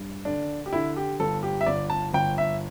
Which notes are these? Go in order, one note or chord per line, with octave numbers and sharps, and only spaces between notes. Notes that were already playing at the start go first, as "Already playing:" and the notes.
Already playing: G2
D3 D4
G4
D3 E4
G4
G1 A4
G4
E5
G1 D5
A5
G1 G5
E5